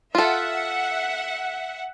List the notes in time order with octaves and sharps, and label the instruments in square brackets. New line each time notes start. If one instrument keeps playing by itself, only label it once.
[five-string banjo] F4 A4 [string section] E5 F#5